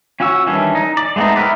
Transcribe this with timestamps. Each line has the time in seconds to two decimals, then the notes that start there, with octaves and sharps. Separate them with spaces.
0.20 C#4 F4 F#4 C#6 E6
0.47 D#3 E3 G3 C#4 D4
0.75 D#4
0.97 D5
1.16 G#3 A3 B3 C4 D#4
1.36 E4 G4 A#4 B4 D5